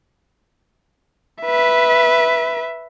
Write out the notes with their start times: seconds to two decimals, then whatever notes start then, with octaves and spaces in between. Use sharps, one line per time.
1.42 B4 E5